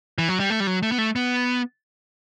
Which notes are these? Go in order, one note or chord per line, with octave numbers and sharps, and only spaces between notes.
E3
F#3
G3
A3
G3
F#3
A3
B3
A3
B3